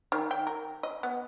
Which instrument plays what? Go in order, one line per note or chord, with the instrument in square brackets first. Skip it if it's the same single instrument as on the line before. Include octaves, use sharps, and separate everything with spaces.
[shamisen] D#3
G5
A#4
D#5
B3